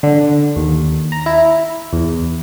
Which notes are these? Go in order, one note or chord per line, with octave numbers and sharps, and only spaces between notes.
D3
D#2
A#5
E4
E2